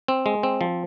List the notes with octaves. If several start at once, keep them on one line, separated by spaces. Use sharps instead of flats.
C4
G#3
C4
F3